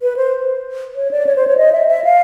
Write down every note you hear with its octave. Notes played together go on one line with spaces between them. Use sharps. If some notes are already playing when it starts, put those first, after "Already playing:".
B4
C5
C#5
D5
C#5
C5
C#5
D#5
E5
E5
F5